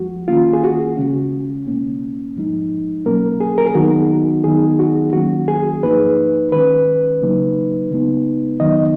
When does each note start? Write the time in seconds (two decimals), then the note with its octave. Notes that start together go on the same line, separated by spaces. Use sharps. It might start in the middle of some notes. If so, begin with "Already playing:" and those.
Already playing: F2 F3 G#3 F#4
0.28 D#3 A#3 C#4 F4
0.53 G#4
0.64 F#4
0.97 C#3 G#3 C#4
1.67 B2 A#3 C#4
2.36 G#2 F3 G#3 D#4
3.05 B2 F#3 A#3 C#4 A#4
3.40 G#4
3.58 A#4
3.66 G#4
3.75 D#3 F#3 B3 D#4 F#4
4.44 D#3 F#3 B3 D#4 G#4
4.79 F#4
5.13 D#3 F#3 A#3 C#4 F#4
5.48 G#4
5.83 G#2 F3 A#3 D#4 B4
6.52 D#3 G#3 C#4 B4
7.22 C#3 F#3 A#3 D#4
7.91 C#3 G#3 B3 D#4
8.60 F2 D#3 F#3 B3 D#4 D#5